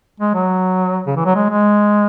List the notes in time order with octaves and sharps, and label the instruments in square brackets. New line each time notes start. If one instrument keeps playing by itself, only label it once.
[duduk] G#3
F#3
C#3
E3
F#3
G#3
G#3